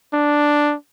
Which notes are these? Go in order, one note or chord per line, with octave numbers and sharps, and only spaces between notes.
D4